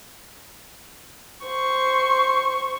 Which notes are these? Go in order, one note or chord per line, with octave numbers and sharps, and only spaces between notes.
C5 C#6